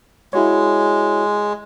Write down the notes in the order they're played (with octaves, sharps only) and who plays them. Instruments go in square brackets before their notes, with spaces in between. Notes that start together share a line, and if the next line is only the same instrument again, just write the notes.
[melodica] G#3 [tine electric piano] E4 F#4 C#5